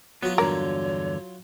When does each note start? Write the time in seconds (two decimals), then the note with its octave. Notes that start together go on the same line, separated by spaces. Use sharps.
0.23 F#3 B3 F4 F#4
0.38 E2 G2 D3 A#3 A#4 C#5